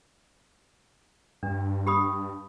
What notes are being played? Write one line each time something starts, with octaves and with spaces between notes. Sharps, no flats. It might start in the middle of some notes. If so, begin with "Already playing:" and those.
G2 D4
G4 B5 D#6